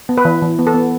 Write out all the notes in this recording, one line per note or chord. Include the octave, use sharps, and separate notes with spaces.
B3
B4
E3
E3
B3
A4
B3